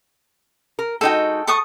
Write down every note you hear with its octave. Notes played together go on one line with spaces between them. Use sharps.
A#4
G#3 D#4 F#4 A4 G5
A4 C#6 D#6